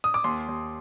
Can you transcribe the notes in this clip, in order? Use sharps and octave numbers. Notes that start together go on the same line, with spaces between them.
D#6
D6
D#2 C6
D#2